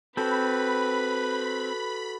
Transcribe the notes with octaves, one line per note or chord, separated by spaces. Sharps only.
C4 F#4 A4 B4 B5